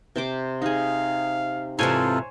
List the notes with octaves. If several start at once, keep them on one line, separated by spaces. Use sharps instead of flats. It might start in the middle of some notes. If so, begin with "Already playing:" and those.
C3 C5 D6
D#4 G#4 F5
G#2 C3 E3 F4 A4 C5 C#5 G#5